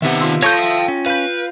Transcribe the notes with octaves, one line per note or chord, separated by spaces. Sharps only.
C3 D#3 B3 D#4 E5 F#5
F4 C6 E6
A4 C#5 F5 A5 C#6 G6 A#6
E5 G5 D#6
C#4
B4 F5 G6